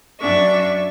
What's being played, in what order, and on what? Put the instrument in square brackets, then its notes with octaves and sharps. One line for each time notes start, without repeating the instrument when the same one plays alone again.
[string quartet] F#2 D4 E5 C#6